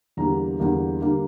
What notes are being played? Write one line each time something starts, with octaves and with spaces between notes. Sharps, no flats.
E2 D3 G3 A#3 A#5
E2 D3 G3 A#3
D3 G3 A#3